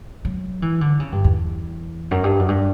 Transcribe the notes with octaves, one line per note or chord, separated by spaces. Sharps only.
F#3
E3
D3
C#3
G2
E2
F#2
G2
F#2
G2